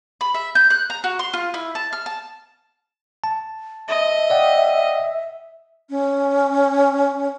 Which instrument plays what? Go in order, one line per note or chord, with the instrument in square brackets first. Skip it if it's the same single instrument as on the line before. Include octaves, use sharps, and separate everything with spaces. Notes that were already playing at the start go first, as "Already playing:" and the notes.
[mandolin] B5
E5
G6
F#6
A#5
F#4
C6
F4
E4
A5
F6
A5
[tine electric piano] A5
[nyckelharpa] D#5 [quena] E5
[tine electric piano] D5 F#5 G5
[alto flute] C#4